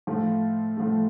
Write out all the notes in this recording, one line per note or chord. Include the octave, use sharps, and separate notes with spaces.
A2 F3 A3
A2 F3 A3